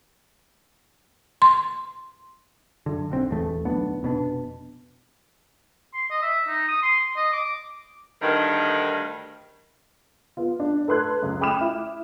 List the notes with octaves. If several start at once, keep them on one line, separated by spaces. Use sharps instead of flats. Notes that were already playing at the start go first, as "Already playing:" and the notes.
C6
F#2 D3
B1 D3 C4
D#1 A1 E2 A3
D1 B1 B3 D4
F1 B2 B3 D4
C6
D#5
E5
D#4
D#6
C6
D#5
D6
D2 G2 D#3
B3 F4
D4
A4 B4 C6 F#6 G#6
C#2 F#2
G5 B5 D6 D#6 F6 E7
E4